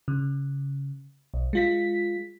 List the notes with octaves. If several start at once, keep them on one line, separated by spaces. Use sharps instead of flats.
C#3
B1
G#3 F4 B6